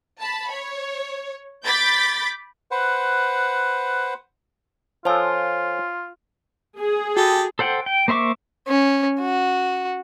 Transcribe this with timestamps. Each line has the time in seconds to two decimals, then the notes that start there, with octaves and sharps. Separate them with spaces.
0.20 A5 B5
0.51 C#5
1.65 B5 D6 G6 A6 B6
2.71 B4 C5 F#5
5.05 F3 F4 A4 C5 C#5 G#5
6.79 G#4
7.17 F#4 G4 A4
7.59 A4 C5 F#5 G5
7.86 G5
8.08 A#3 C5 E5 C#6 D6
8.68 C#4
9.20 F#4